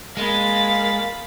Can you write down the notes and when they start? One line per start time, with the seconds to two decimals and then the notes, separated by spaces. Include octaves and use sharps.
0.17 G#3 A#3 F5 B5 A6